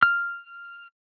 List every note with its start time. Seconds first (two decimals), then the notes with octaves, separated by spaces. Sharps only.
0.03 F6